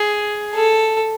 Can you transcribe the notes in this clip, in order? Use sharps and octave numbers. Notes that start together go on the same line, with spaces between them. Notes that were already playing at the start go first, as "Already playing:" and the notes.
Already playing: G#4
A4